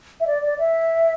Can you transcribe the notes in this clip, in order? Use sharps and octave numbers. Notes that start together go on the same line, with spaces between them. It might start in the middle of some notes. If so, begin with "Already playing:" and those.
E5
D5
D5
E5